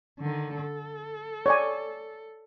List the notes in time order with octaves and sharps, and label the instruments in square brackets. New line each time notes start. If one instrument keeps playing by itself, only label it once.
[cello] D3 D#3
A4
[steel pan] C#5 D5 G#5